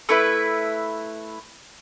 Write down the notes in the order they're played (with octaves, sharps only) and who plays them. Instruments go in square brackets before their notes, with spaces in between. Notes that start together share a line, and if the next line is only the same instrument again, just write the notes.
[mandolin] A3 E4 B4 E5